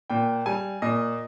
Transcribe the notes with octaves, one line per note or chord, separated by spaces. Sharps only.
A#2 G5
G3 G#5
A#2 D#5